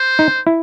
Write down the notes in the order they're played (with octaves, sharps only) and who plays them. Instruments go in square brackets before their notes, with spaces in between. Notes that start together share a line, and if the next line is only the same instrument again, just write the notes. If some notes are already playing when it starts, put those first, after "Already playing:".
Already playing: [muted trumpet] C5
[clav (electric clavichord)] D#4
E4